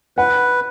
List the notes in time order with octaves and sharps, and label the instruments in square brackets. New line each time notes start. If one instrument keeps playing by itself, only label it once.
[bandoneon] B4 [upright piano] F#5